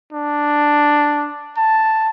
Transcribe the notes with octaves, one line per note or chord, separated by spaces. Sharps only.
D4
A5